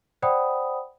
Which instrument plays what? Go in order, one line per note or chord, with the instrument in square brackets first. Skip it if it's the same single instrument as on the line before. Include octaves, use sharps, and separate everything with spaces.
[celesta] C5 D5 F#5 G5 B5 D#6